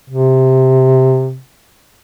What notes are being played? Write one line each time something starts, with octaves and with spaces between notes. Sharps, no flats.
C3